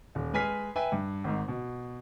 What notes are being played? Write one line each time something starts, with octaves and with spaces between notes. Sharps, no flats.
D#1
G#3 B4 G#5 F6 B6 C7
B4 E5 G5 G#5
G2
G#1 G#2
B2